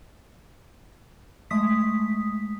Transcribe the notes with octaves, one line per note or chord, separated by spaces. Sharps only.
G#3 A3 D#6 B6